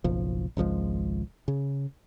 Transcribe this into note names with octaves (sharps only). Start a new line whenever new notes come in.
F#1 B1 F3
G#1 C#2 F3 G#3
C#3